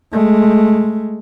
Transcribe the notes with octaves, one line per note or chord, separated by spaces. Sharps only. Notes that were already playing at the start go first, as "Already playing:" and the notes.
G#3 A3